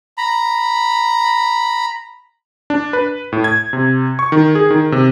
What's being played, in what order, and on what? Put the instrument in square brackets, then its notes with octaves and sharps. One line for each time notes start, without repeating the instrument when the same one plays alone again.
[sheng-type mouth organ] A#5 B5
[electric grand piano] D4
B4
A2
G#6
C3
C#6
D#3
G#4
D#3
C3